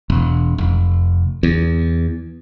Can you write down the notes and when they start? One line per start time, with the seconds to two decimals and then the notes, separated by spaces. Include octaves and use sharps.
0.10 E1
0.58 F1
1.43 E2